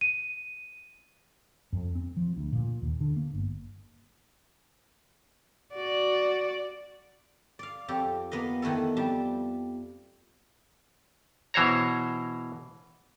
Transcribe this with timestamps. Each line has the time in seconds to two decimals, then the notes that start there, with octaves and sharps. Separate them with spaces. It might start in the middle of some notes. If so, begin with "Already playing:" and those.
0.01 D#7
1.73 F2
1.95 C4
2.17 F3
2.36 D2
2.52 A#2
2.82 D#2
3.00 D3
3.16 A#3
3.34 G1
5.75 F#4 D5
7.59 D5 F5
7.88 F2 G4 A4
8.31 A#3 B3 B4 D#5
8.62 D#3 E3 A3 A4
8.97 F2 G3 A5
11.54 B2 E3 C5 C#5 A#5